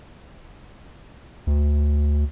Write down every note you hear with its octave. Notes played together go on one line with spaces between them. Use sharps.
D2